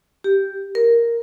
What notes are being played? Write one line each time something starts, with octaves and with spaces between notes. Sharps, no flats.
G4
A#4